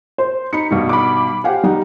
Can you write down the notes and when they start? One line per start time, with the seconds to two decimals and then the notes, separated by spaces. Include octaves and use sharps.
0.18 C5
0.53 D#4 B5 C#7
0.71 G2 B2 D#3
0.89 B5 D6
1.44 G4 C5 F5 F#5 G#5
1.63 D#3 G3 D#4 F#5